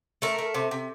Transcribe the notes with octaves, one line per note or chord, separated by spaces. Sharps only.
A3 A#4
A3
C3
C3